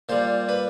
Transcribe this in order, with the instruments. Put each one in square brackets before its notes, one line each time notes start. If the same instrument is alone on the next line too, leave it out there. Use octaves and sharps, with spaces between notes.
[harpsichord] A#2 G3 C5
B4